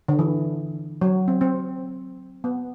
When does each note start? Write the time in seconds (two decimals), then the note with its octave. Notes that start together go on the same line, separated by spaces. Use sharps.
0.08 D3
0.19 E3
1.01 F#3
1.28 C4
1.41 C4
2.44 B3